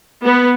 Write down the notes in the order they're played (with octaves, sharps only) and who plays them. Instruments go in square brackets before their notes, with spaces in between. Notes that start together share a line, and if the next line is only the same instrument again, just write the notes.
[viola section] B3